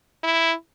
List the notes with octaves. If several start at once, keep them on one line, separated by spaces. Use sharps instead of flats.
E4